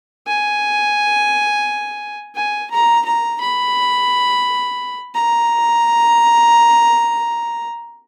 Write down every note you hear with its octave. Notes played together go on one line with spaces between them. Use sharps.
G#5
G#5
A#5
A#5
B5
A#5